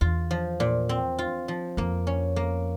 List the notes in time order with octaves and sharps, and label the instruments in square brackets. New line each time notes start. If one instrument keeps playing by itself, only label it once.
[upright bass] E2 [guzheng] F4
[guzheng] F3
A#2
C4
F4
F3
[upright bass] F2 [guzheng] A#3
[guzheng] C#4
A#3